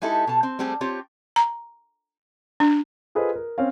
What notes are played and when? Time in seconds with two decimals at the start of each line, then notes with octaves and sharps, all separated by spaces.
0.02 G#3 D#4 E4 G4 A4
0.27 B2 A5
0.43 C4
0.59 G3 A3 C4 G4 G#4
0.81 C4 F4 G4 C#5
1.36 A#5
2.60 D4
3.15 F4 G#4 A4 B4 C5 D#5
3.36 A#4
3.58 C4 C#4 F5